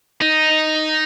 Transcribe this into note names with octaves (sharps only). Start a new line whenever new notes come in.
D#4